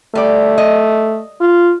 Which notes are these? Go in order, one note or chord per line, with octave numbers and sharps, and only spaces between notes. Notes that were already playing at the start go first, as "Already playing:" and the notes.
G3 A3 D5
D#5
F4